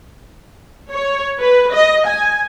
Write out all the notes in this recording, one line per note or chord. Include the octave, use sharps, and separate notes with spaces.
C#5
B4
D#5
G#5